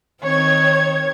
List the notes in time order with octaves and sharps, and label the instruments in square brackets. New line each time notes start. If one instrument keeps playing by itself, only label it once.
[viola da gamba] D#3 C4 [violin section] C#5 G#6